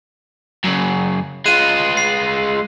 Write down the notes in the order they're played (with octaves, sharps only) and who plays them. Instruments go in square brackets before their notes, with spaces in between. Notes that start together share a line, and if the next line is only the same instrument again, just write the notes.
[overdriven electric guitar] F#2 C#3
[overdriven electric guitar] G#3 F4 [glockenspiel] F#6 D#7 E7
[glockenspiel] C7